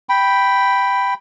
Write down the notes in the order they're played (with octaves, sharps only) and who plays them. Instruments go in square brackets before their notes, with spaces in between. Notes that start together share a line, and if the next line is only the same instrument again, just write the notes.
[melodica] G5 B5